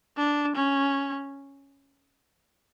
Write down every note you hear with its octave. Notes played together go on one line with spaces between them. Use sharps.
D4
C#4